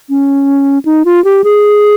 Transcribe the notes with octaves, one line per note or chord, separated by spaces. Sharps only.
C#4
D#4
F4
G4
G#4